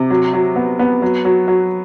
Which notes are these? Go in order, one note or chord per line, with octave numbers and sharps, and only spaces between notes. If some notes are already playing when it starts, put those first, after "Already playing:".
Already playing: C3
F#3
F#3
B3
B3
F#3
F#3
F#3